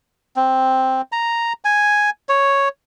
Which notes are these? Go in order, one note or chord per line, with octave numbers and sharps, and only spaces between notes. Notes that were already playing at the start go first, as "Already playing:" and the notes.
C4
A#5
G#5
C#5